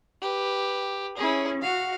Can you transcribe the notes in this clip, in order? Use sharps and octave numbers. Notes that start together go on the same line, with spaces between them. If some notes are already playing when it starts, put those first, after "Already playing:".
G4 B4
C#4 E4 G#4
F#4 F5